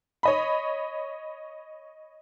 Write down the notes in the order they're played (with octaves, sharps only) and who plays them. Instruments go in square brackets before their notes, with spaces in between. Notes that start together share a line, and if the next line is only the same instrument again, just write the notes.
[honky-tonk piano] C#5 D#5 B5